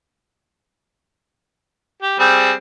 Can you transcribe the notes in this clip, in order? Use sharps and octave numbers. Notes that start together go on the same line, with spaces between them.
G4
G3 C4 G#4